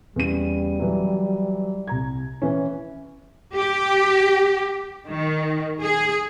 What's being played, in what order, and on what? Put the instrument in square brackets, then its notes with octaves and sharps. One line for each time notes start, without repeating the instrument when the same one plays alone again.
[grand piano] E2 C#3 D#7 [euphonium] G3
[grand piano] E3 F#3
C2 A#5 G#6
E3 C#4
[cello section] G4
D#3
G#4